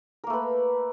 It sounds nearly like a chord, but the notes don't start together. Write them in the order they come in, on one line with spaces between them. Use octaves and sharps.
A#4 A#3 A3 B4